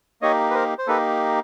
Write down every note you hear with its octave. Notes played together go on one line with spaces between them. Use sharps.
A#3 D#4 G4 C#5 D#5
B4
A#4 C5
C5
A#3 D#4 G4 A4 B4